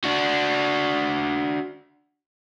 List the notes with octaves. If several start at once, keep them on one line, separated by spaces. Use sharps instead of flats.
D4 F#4